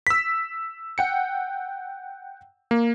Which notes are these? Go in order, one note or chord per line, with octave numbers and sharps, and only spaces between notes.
E6 B6
F#5 G5 C#7
A#3